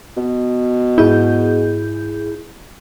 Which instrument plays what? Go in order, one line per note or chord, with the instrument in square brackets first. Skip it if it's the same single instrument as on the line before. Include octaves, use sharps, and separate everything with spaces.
[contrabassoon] B2
[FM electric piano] G#2 G#4 G6 [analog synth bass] E4